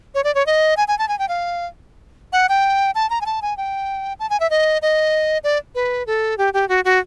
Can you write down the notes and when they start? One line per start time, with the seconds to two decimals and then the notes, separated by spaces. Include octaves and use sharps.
0.15 C#5
0.24 D5
0.35 C#5
0.46 D#5
0.77 G#5
0.88 G#5
0.99 A5
1.08 G#5
1.19 G5
1.29 F5
2.33 F#5
2.49 G5
2.95 A5
3.10 A#5
3.21 G#5
3.26 A5
3.42 G#5
3.57 G5
4.20 A5
4.30 G#5
4.40 E5
4.50 D#5
4.82 D#5
5.44 D5
5.75 B4
6.07 A4
6.38 G4
6.54 G4
6.69 F#4
6.85 F#4